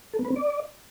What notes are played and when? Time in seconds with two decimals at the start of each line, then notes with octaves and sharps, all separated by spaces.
0.13 A4
0.19 B3
0.25 B4
0.30 C4
0.36 D5